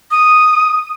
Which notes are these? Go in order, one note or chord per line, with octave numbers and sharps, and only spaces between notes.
D#6